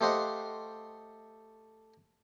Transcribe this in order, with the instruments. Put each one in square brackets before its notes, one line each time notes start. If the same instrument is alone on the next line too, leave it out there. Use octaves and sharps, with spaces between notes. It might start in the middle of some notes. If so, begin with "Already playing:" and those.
[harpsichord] A3 G4 C5 D#5 F5 F#5